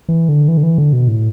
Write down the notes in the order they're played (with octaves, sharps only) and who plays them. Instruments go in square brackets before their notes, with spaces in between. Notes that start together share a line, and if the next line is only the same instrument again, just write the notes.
[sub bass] E3
D3
E3
D3
E3
D3
B2
A2